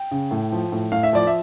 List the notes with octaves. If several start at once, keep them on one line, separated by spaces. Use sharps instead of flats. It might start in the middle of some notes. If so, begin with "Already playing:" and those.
Already playing: G5
C#3
A2
F3
A2
A2 F5
E5
F3 D5
E5